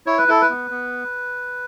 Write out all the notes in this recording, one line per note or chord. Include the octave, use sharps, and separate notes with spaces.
E4 C#5
B4
E4 A4
B4
B3
B3